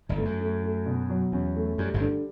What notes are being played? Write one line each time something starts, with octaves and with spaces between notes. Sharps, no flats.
G1 G2
A3
F#2
A3
A3
B2
F#3
E2 C#4
A3
F#2 G3
G1 G2
D3